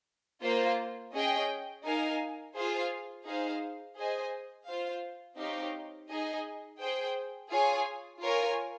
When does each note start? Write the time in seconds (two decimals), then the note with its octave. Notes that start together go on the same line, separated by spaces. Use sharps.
0.42 A#3 F4 C5
1.14 C#4 G#4 D#5 G5
1.84 D#4 A#4 F5 G#5
2.55 F4 G#4 C5 F5 G#5
3.26 D#4 G#4 C5 F5
3.96 G#4 C5 D#5 G#5
4.67 F4 C5 F5
5.38 C4 D#4 G4 C#5 F5
6.08 D#4 G#4 D#5 G#5
6.80 G#4 C5 G5
7.51 F4 G#4 C#5 G#5
8.21 F4 A#4 C#5 G#5